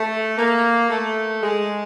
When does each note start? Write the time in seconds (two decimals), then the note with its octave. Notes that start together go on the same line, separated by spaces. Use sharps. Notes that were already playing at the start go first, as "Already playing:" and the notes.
Already playing: A3
0.37 A#3
0.90 A3
1.43 G#3